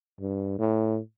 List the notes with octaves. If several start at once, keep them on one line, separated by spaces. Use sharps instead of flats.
G2
A2